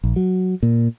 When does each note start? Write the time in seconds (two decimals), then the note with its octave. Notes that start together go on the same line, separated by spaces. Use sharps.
0.04 A#1
0.16 F#3
0.63 A#2